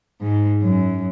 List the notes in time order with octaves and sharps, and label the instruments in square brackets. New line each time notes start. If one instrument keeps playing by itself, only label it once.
[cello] G#2
F#2